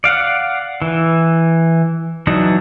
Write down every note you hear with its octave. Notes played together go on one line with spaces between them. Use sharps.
D5 F5 F#5
E3
E3 F#3 D4 D#4